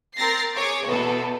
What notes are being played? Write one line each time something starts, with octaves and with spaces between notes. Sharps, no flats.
C4 A#4 A#5 A6 A#6 C7
G#4 C#5 D6
E2 B2 B3 A4